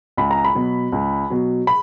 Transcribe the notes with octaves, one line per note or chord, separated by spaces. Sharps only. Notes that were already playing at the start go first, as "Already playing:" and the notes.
C#2 B5
A#5
B5
B2 F#3
C#2
B2 F#3
B5